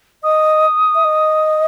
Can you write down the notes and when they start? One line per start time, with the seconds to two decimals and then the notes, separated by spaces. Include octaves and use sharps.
0.23 D#5 D#6
0.95 E5
1.04 D#5